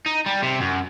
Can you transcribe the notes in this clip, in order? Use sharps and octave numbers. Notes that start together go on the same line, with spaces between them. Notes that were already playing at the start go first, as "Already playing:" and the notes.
D#4
G3
C3
F#2